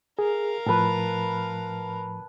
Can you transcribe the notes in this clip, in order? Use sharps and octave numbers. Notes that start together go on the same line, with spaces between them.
G#4 A#4 F5
A2 F3 B4 A5